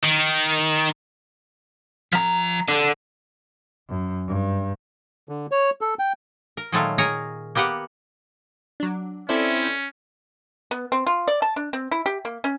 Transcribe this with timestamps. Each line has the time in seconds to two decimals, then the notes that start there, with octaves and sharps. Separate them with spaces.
0.04 D#3
2.13 F3 A#5
2.68 D3
3.89 F#2
4.27 G2
5.29 D3
5.51 C#5
5.81 A4
5.99 G5
6.57 A#4
6.72 A#2 D#3 F#3 G#3 A3 F5
6.98 G#4 A#4 C#5 A#5
7.55 A#3 B3 G4 B4 F#5
8.80 F#3 D4
9.29 C4 C#4 E4 A4 C5 D5 E5
10.71 B3
10.92 C4
11.06 F4
11.28 D5
11.42 A5
11.56 D4
11.73 C4
11.91 E4
12.06 G4
12.25 A#3
12.44 C#4